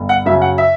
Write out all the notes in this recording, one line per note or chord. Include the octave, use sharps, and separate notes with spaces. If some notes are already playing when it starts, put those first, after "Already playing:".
Already playing: G1
F#5
F#2 C#3 F#3 E5
F#5
E5